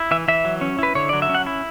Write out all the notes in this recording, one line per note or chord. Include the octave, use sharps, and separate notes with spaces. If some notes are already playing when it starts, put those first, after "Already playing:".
Already playing: E4
E3 E5
E3 E5
F#3
C#4
E4 B4
D3 C#5
F#3 D5
E5
C#4
F#5
E4